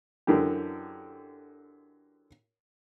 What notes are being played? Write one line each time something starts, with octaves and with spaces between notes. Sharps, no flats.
F#2 D3 E3 G4